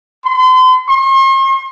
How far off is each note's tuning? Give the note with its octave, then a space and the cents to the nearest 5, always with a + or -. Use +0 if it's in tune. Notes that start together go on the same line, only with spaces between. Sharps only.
C6 -40
C6 +45